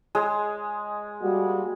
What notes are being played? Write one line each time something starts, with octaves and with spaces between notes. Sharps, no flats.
G#3
G3 A#3 F#4